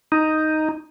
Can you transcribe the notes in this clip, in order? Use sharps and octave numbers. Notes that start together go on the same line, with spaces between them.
D#4